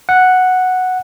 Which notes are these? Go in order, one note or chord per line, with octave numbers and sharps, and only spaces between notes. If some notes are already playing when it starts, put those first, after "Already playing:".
F#5